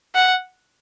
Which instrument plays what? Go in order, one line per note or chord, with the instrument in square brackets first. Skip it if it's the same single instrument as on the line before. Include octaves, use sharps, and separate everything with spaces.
[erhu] F#5